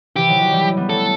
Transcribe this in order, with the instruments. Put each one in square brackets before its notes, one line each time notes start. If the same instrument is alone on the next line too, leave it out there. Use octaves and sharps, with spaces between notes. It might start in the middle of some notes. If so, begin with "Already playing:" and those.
[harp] C3 E3 [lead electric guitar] G4
[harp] D#3 F#3
D#3 F#3
E3 G3
G3 B3
[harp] F#3 A3 [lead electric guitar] A4